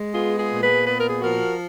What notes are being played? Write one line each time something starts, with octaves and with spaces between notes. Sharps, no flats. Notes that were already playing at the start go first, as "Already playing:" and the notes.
Already playing: G#3
B3 F4 G#4
F4 G#4
A#2
G#4 B4
B3 B4
A#4
G#4
F3 F#4 A#4